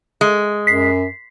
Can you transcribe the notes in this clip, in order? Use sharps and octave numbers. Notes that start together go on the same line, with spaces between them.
G#3
F#2 B6 C7